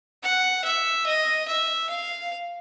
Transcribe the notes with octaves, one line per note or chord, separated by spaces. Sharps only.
F#5
E5
D#5
E5
F5